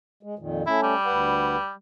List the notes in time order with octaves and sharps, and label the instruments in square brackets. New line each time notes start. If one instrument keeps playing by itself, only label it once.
[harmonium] G#3
F2 A#2 D#3
[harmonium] A3 C#4 [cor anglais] E4
[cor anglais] G3
[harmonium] D2 B4 F#5